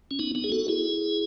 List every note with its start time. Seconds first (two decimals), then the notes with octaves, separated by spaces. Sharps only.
0.11 C#4
0.19 B3 D#4
0.35 B3 D#4
0.44 G#4
0.52 F#4 A4
0.68 E4 G#4